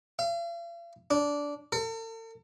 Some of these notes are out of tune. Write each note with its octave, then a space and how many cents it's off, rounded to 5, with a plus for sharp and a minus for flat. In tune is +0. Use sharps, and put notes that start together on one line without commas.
F5 -45
D4 -15
A4 +45